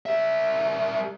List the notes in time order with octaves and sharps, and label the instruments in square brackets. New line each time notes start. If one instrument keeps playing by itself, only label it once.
[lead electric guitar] G3 E5